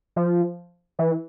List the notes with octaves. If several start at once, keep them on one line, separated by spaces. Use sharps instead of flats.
F3
E3